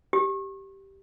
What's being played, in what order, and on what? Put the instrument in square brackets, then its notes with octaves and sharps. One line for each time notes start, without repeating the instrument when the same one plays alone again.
[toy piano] G4